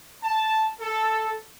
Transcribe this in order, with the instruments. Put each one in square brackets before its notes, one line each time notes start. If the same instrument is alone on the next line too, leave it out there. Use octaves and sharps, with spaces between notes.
[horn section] A5
A4